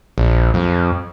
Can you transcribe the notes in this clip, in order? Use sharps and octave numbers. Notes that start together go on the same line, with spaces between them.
A#1
F2